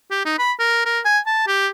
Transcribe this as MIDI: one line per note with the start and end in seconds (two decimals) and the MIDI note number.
0.11 0.21 67
0.25 0.35 63
0.39 0.52 83
0.59 0.82 70
0.86 1.00 70
1.05 1.19 80
1.26 1.43 81
1.47 1.68 67